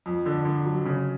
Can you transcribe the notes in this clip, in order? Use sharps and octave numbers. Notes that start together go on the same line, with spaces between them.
F2
D3
D3
F#3
C#3